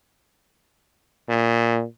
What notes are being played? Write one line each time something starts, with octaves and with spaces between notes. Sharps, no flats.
A#2